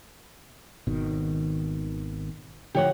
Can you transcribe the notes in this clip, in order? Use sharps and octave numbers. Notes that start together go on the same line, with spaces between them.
G#1 B2 D#3
D3 E3 F3 G4 C#5 F#5